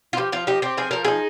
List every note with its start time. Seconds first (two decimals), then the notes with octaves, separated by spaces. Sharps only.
0.13 F4
0.17 F3 G4
0.32 F3 F4
0.47 D#4 G4
0.62 C4 G4
0.77 F3 G#4
0.91 F3 A#4
1.05 D#4 G#4